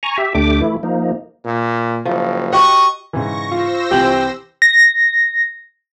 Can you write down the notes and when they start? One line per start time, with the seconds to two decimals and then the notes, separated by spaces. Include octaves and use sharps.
0.03 G#5 A#5 C#6
0.18 G4 E5
0.35 D2 A3 D4 G4 D6
0.61 E3 A3 E4
0.83 F3 A#3 D#4
1.45 A#2
2.05 F#1 F3
2.53 F#4 G4 D#5 F#5 C#6
3.13 G#2 C#3 E3 C#6 A#6
3.52 F4 C5 E6 A#6
3.91 C2 E3 G4 F#7
4.62 A#6